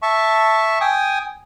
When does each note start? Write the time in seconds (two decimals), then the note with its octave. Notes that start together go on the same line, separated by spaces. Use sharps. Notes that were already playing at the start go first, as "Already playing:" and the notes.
0.02 E5 A5 C#6
0.81 G5 G#5 D#6